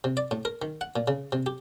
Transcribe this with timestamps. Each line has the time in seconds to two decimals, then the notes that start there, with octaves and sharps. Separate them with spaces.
0.04 C3
0.17 D5
0.31 A2
0.45 A#4
0.62 D#3
0.81 F#5
0.96 A#2
1.08 C#3
1.32 C3
1.46 G4